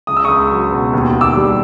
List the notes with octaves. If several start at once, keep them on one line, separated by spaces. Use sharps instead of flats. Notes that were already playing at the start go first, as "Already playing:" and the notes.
C#2 D#6
E6
C#2 C#6 D#6
F#3
B2
D#2
D#2
D6 E6
G3